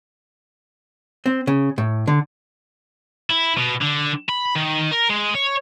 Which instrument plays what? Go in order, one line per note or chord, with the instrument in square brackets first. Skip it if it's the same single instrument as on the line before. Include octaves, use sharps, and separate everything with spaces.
[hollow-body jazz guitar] C4
C#3
A2
D3
[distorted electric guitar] E4
B2
D3
B5
D#3
A#4
G#3
C#5